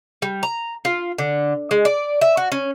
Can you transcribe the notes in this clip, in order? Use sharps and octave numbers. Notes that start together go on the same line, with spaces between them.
G3
A#5
F4
D3
G#3
D5
E5
F#4
C#4